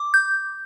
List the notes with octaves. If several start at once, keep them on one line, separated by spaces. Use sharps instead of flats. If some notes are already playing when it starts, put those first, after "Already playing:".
Already playing: D6
G6